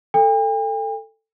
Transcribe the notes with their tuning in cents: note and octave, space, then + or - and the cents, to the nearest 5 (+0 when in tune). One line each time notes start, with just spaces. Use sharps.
A4 +10 G5 +45